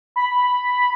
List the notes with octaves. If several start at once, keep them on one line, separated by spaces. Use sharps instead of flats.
B5